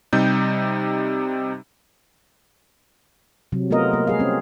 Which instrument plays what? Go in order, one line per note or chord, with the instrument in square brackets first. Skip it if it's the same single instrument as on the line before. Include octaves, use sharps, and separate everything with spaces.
[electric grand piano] C3 G3 D#4 G6
[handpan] C3 F#3
A3 B3 F4 A#4 D#5
A#3
G3 G#4 F5
C4 C#4